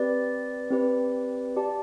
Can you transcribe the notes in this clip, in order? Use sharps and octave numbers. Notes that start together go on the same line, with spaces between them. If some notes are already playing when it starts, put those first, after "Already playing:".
Already playing: C4 G4 B4 D5
C4 G4 B4 D5
G4 D5 A5